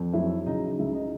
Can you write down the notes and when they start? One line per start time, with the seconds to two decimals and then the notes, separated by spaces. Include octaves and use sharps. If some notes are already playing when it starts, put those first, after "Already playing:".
Already playing: F2
0.13 F#3 E4 E5
0.46 C#3 D#4 D#5
0.79 C#2 E4 E5
0.95 D#4 D#5